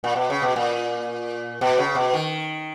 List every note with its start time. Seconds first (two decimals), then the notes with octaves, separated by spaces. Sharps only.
0.04 A#2
0.16 B2
0.30 C#3
0.42 B2
0.56 A#2
1.61 B2
1.78 C#3
1.95 B2
2.14 D#3